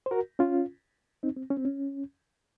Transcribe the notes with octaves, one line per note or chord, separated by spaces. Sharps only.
C5
F#4 A#4
C#4 F4
C4 D#4
C4
C#4
C4
C#4